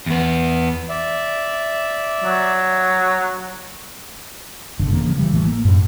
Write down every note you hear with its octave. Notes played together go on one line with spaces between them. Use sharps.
E2 B3
D5 E5
F#3
G1 C2 F2 D3
C#3 E3 F3 A#3
E3 G3
A1 E3 A3
A#3
F#2 A2